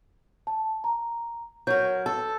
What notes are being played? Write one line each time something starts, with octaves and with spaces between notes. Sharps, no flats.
A5
A#5
F#3 A#4 G6
A4